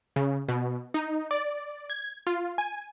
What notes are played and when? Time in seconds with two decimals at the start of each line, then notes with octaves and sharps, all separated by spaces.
0.16 C#3
0.48 B2
0.94 D#4
1.31 D5
1.90 G#6
2.27 F4
2.58 G#5